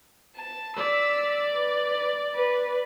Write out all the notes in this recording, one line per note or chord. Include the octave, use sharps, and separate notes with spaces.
A5
D5 E6 B6
B4
B4